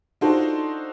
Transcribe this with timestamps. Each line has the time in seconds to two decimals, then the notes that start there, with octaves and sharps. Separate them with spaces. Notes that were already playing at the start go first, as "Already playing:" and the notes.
0.21 D4 D#4 F4 F#4 A4 C5